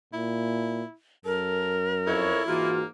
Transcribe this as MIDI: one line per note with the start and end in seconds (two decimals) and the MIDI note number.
0.13 0.83 46
0.13 0.93 64
1.25 2.33 42
1.25 1.79 69
1.25 2.45 70
2.07 2.42 41
2.07 2.69 64
2.07 2.42 69
2.07 2.42 73
2.47 2.85 44
2.47 2.85 52
2.47 2.85 58
2.47 2.78 65
2.47 2.82 66